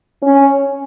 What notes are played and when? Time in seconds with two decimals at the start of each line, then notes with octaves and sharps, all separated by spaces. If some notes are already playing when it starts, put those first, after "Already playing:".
0.23 C#4